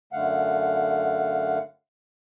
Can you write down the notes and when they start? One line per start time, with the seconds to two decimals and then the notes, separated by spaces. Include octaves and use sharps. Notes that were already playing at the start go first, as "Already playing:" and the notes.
0.13 F#2 D3 A3 F5 F#5